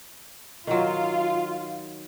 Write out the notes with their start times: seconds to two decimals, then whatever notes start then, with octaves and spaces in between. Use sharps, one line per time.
0.67 D#3 F#3 F4